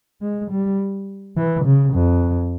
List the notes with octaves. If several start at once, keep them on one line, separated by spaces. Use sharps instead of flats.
G#3
G3
E3
C#3
F2